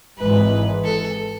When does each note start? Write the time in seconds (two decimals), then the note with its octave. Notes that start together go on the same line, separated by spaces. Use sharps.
0.18 G#1 G#2 E3 G#3 B4
0.84 A4